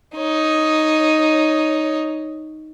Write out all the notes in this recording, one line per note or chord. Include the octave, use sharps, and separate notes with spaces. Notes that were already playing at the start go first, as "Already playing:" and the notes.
D#4 C#5